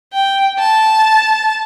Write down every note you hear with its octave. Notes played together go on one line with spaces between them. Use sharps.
G5
A5